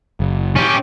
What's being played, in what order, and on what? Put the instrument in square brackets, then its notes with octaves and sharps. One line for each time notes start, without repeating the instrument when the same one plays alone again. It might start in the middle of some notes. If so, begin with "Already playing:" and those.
[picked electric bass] F#1
[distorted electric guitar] C#4 G4